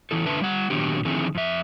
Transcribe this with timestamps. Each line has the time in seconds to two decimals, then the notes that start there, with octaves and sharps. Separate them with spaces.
0.11 E2 E3 E4 A4
0.26 D3 B4 E5 A5
0.41 G3 F#5
0.70 A#2 D#3 F#3 B3 D4 G4
1.05 D3 D#3 F3 C4 E4 G#4
1.35 F2 E5